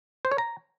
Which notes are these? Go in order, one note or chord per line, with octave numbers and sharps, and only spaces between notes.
C5
C#5
A#5